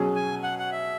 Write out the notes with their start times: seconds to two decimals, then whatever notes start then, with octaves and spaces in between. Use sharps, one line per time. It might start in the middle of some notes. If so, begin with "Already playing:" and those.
Already playing: B2 F#3 C#4 G#4
0.15 G#5
0.43 F#5
0.59 F#5
0.71 E5